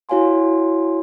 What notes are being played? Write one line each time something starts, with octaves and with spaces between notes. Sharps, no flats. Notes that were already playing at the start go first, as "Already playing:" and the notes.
E4 F#4 C#5 F5 G#5 C6